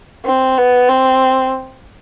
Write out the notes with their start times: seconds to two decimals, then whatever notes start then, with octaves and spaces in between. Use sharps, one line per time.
0.25 C4
0.58 B3
0.89 C4